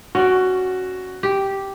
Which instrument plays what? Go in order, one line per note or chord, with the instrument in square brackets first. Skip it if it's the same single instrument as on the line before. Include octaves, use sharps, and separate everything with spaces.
[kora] C#4 D5 [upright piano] F#4
[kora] G4